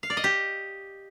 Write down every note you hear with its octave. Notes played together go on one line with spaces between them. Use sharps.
F5
D5
D#5
G4